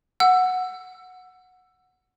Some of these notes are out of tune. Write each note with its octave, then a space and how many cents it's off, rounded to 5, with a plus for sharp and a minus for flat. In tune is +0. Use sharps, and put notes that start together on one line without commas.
F#5 -5 E6 +20